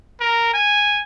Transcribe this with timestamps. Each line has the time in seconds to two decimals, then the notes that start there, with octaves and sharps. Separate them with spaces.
0.20 A#4
0.53 G#5